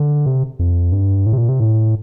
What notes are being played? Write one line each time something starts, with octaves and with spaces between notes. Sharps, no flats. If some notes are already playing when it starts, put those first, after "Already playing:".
Already playing: D3
C3
F2
G2
A2
C3
A#2
C3
A2